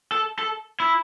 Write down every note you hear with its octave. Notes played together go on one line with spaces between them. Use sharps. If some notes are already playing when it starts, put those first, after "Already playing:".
A4
A4
E4